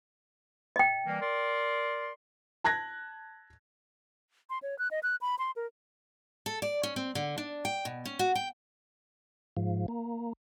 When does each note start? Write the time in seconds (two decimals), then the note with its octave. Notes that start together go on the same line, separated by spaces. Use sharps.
0.76 D#5 G5
1.06 E3 G3 A#3
1.21 A#4 D5 C6
2.64 A5 F#6 G#6 A#6
4.50 C6
4.62 C#5
4.79 F#6
4.91 D#5
5.03 F#6
5.21 B5
5.39 C6
5.56 A#4
6.46 A4
6.62 D5
6.83 C#4
6.96 C4
7.15 D3
7.38 D4
7.65 G5
7.85 B2
8.05 C#4
8.19 F#4
8.35 G5
9.57 G#2 F3
9.88 A#3